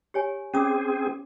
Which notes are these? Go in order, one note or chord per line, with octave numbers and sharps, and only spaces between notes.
G4 C#5 G#5
C4 C#4 G#4 D6 D#6